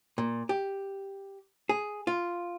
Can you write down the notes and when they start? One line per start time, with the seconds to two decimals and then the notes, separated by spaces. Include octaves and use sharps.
0.18 A#2
0.49 G4
1.69 G#4
2.07 F4